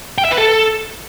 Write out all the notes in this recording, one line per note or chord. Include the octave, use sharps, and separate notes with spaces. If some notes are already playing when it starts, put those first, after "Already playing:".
G5
E5
B4
A4